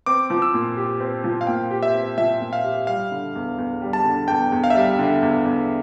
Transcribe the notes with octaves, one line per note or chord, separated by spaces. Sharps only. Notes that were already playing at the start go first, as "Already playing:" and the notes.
C4 D6
F3
E6
A#2
G4
C4
F3
F5
A#2 G5
G4
E5
C4
F3 E5
A#2
F5
G4
G3 F5
D3
E2
E2
G3
A5
D3
E2 G5
E2
F5
E5
G3 F5
D3
E2
E2